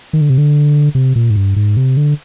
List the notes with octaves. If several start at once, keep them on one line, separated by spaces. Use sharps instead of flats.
D#3
D3
C3
D3
C3
A#2
G#2
G2
G#2
C3
D3